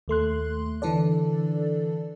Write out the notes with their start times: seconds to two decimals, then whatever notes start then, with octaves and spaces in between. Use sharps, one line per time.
0.08 D#2 A3 C6 F#6
0.82 D3 E3 D4 A4 D5